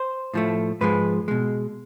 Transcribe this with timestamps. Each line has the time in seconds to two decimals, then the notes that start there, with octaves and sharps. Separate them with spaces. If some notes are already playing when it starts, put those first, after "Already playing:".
Already playing: C5
0.34 A2 F3 A3
0.81 G#2 F3 G#3 B4
1.28 B2 G#3